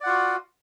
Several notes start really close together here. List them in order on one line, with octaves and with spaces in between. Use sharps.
D5 F#5 F4 F#4